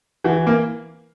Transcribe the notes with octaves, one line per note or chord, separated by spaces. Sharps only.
E3 F#4
A#3